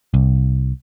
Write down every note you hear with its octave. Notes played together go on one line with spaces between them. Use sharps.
C2